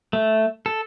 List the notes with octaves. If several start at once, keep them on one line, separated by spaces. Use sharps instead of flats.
A3
A4